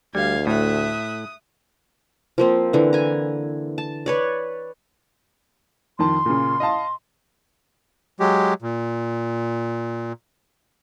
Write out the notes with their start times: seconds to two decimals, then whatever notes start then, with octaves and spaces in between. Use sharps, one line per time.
0.15 D2 G3 F5 G#6
0.47 A2 E5 D#6 F#6
2.38 F3 A#3 C4
2.73 D3 E3
2.93 G#5 A#5
3.78 A5
4.06 B4 C#5 D5
5.99 F2 D#3 A5 C6
6.26 A#2 C#3
6.60 D#5 F5 A5
8.20 F#3 G#3 G4
8.62 A#2